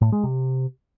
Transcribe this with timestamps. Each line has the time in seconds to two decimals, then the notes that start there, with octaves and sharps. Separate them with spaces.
0.01 A2
0.12 G#3
0.23 C3